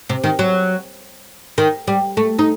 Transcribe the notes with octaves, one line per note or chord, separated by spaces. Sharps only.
C3
D#3
F#3
D#3
G3
A3
D#4